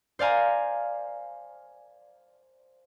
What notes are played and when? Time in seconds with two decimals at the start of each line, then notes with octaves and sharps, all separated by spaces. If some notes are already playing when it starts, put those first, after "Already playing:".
0.19 C5 D5 F5 G#5 A#5